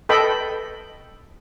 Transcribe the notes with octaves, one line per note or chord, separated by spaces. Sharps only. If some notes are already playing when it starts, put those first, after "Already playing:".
A4 B4 D#5 G5 B5